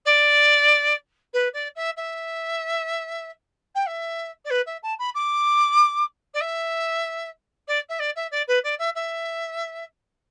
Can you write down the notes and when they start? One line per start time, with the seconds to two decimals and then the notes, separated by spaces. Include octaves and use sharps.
0.05 D5
1.33 B4
1.53 D5
1.75 E5
1.97 E5
3.75 G5
3.86 E5
4.45 D5
4.50 B4
4.66 E5
4.83 A5
4.99 B5
5.15 D6
6.34 D5
6.41 E5
7.68 D5
7.89 E5
7.99 D5
8.16 E5
8.31 D5
8.48 B4
8.64 D5
8.79 E5
8.95 E5